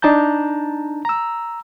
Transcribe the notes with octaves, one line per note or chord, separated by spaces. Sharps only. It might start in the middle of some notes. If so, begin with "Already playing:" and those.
D4 D#4 A5 A#5 G6
A#5 E6